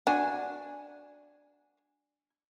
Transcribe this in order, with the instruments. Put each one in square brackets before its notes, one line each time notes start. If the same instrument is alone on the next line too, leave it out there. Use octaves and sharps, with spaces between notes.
[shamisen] D4 F#4 [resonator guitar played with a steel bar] G#5